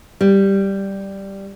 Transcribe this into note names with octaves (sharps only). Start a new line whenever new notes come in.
G3